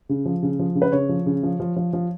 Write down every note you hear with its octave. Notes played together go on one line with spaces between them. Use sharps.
C#3
F3
C#3
F3
C#3
B4
C#3 C#5
F3
C#3
F3
F3
F3
F3